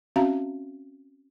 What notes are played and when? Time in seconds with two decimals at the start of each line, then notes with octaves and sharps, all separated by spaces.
0.16 C4 C#4 F#4 E5 F5 A#5